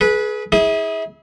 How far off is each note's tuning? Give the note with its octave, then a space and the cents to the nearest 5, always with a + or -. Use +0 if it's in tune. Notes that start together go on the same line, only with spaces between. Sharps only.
G#4 +30 B4 -15
E4 -30 G#4 +0 D#6 +40